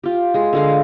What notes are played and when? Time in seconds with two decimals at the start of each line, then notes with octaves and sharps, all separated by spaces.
0.04 F4 G4
0.34 G#3 G#4
0.53 D3 G#3 F5